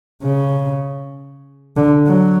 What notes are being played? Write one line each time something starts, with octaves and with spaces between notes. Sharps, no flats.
C#3
D3
F#3